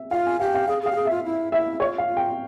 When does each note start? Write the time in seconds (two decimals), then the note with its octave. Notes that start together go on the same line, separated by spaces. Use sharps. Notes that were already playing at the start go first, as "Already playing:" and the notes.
Already playing: E5
0.11 F4 F5
0.26 G#5
0.40 G4 F5
0.54 F5
0.68 G#4 F5
0.82 G#4 F5
0.92 G4
0.95 G#4
1.05 E5
1.11 F4
1.25 E4
1.52 E4 E5
1.80 F4 C#5
1.98 F5
2.07 F4
2.17 G5